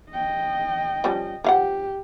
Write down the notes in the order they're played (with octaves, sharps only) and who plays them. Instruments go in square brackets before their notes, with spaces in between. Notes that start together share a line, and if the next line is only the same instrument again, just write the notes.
[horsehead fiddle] D#5 G5
[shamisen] F3 G3 C#4
[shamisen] F3 F5 F#5 [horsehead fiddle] G4